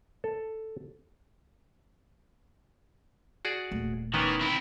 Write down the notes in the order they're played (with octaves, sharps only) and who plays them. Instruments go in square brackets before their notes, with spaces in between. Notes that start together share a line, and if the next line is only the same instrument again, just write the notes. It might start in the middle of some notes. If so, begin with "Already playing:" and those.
[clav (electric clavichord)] A4
F#4 G#4 D5
[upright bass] D#1 A3
[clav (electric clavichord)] D#3 B3 C#4 [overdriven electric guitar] E3
[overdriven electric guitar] C4 E4